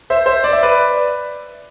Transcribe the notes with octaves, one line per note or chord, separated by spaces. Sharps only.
C5 E5
C5 E5
D5
E5
B4 D5